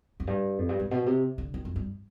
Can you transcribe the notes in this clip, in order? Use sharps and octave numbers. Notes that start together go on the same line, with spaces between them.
F2
G2
F2
G2
G#2
B2
C3
D3
D#3
F2
G2